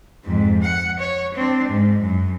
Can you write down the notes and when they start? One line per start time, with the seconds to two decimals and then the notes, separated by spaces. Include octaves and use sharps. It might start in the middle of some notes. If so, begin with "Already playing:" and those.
0.25 F2 G#2
0.62 F#5
0.99 C#5
1.34 C4 D4
1.68 G#2
2.01 F#2